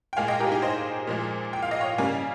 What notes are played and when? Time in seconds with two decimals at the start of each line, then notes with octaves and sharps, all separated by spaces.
0.13 G5
0.17 A#2 G#3 F5 G#5
0.28 D#5 G5
0.39 G4 A#4
0.47 G#4
0.52 D#4 G4
0.62 C5 D#5
1.07 A#2 F3 G#3
1.53 G5
1.63 F5
1.71 D#5
1.81 C#5 F5
1.98 C#3 G3 A#3 F5 G#5